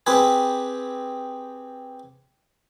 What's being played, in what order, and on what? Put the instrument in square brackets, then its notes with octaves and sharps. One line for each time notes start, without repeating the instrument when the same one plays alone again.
[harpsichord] C4 G4 G#4 B4